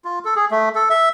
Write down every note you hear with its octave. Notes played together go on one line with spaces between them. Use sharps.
F4
A4
G#4
A3
A4
E5